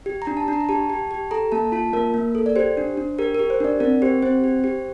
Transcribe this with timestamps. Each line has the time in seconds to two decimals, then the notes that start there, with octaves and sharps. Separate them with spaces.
0.06 G4
0.22 A#5
0.27 D4
0.37 A5
0.48 D4 A#5
0.61 A#5
0.69 G4 A5
0.90 G4
1.11 G4
1.31 A4 A#5
1.52 A#3 A5
1.72 F4 A5
1.93 A#3 A#4
2.14 A#3
2.35 A4
2.46 D5
2.56 G4 C5
2.77 D4
2.97 D4
3.18 G4 A#4
3.35 G4 A#4
3.50 C5
3.60 D4 D5
3.80 C4 A#4
4.02 G4 C5
4.23 C4 C5
4.44 G4
4.64 G4